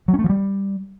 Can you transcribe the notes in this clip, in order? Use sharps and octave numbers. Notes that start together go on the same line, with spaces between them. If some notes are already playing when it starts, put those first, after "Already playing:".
F#3
C#4
A3
F3
G3